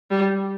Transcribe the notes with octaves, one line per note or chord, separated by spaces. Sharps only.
G3